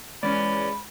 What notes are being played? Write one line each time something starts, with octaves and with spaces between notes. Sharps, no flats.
E2 G#3 C#4 D5 B5